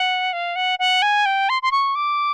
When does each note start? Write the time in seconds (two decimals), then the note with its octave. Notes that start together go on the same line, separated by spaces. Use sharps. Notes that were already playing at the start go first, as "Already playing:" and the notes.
Already playing: F#5
0.33 F5
0.56 F#5
0.79 F#5
1.02 G#5
1.26 G5
1.49 C6
1.62 C6
1.71 C#6
1.95 D6